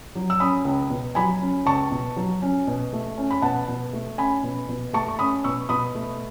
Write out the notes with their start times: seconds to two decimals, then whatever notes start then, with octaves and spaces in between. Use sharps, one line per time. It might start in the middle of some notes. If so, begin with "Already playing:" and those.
0.15 F#3
0.30 E6
0.40 C#4 B5 D#6
0.65 C#2
0.90 B2
1.15 F#3 G#5 B5
1.41 C#4
1.66 C#2 A5 C#6
1.91 B2
2.16 F#3
2.42 C#4
2.67 B2
2.93 A3
3.18 C#4
3.31 B5
3.42 B2 F#5 A5
3.68 B2
3.93 A3
4.18 C#4 G#5 B5
4.43 B2
4.69 B2
4.93 A3 A5 C#6
5.08 C#6
5.19 C#4 B5 D#6
5.44 B2 C#6 E6
5.69 B2 B5 D#6
5.95 A3